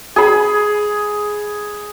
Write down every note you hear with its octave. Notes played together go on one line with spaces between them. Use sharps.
G#4 B5